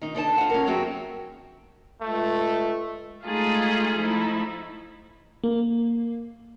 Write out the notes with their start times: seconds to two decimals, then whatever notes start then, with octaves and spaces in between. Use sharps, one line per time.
0.01 D#3 D#4
0.15 D3 D#4 C#5 A5
0.38 F4 C5 F#5
0.50 C#4 A#4
0.67 F#2 F#3 C4 F#4 G#4 G5
2.01 C#2 A3
3.26 G#3 A3 D#4 F4 G#4 A4
3.98 F3 A3 D#4 E4
5.44 A#3